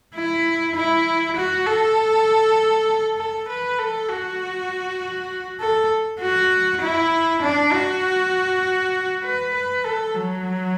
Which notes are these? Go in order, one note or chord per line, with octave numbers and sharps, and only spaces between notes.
E4
E4
F#4
A4
A4
B4
A4
F#4
A4
F#4
E4
D4
F#4
B4
B4
A4
F#3